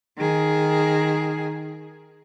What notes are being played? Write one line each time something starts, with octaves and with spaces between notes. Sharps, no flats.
D#3 G#4